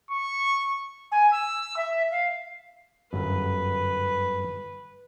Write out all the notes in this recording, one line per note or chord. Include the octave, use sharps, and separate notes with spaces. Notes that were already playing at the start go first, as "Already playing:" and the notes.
C#6
G#5
E6
E5
F5
G1 F#2 B4